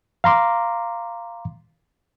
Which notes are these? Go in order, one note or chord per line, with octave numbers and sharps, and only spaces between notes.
F5 A#5 C6 D6